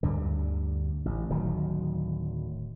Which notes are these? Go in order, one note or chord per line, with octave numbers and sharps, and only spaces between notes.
D2 G2 D3
A1
D1 D#3 F#3